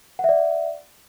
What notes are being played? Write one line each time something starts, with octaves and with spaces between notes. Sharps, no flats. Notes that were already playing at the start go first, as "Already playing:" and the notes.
D5 E5 F#5